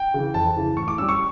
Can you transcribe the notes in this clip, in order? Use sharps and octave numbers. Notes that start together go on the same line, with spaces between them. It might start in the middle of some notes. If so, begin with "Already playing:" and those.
Already playing: G5
C#3 E3
F2 A5
C#3 E3
A2 C#6
D6
G3 C#4 E6
C#6